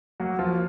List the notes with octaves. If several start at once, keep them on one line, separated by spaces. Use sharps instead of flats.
F#3 A#3 F#4
F3 F4